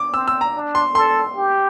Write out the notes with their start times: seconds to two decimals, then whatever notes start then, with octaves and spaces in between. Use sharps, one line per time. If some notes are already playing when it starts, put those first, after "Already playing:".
Already playing: D6
0.14 C4 E6
0.28 E6
0.41 A#5
0.55 D4
0.75 C6
0.95 A4 C6
1.36 G4